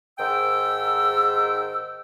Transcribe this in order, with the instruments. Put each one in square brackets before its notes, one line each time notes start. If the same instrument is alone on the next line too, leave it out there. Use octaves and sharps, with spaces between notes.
[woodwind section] G#2 D#3 G5 E6